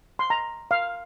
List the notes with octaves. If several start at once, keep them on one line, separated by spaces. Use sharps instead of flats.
C6
A#5
F5